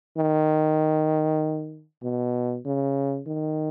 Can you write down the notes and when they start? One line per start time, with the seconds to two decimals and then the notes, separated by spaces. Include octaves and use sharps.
0.17 D#3
2.03 B2
2.66 C#3
3.27 D#3